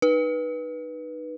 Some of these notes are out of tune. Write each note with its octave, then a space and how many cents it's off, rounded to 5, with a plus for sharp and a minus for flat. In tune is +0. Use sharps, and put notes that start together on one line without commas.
D#4 -20 B4 -15